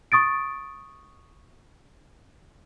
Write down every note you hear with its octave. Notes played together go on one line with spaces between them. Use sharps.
C#6 D#6 A6 D7